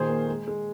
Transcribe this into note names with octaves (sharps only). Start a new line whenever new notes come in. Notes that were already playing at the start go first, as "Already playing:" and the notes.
Already playing: A#2 D#3 G#4 C5
A#3
G#3
G#3